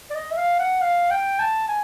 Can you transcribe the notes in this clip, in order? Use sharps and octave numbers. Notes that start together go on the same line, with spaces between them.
D5
D#5
E5
F5
F#5
F5
G5
A5
G#5